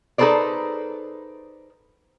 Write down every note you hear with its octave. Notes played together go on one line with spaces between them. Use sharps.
D#4 G#4 A4 B4 C5 D5